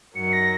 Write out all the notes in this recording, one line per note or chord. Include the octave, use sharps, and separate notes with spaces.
F#2 D#3 F#3 C#7
A#6